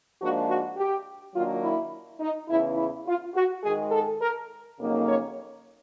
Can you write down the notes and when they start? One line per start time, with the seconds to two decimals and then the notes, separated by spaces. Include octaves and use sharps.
0.20 G#2 F3 A#3 D4 F#4
0.49 F#4
0.77 G4
1.34 D#3 F#3 A#3 D4 F4
1.63 E4
2.20 D#4
2.49 E2 C#3 E3 E4
2.77 E4
3.06 F4
3.34 F#4
3.63 G#2 D#3 G#3 G#4
3.91 A4
4.20 A#4
4.78 F2 C#3 F#3 A#3 D#4
5.06 C#5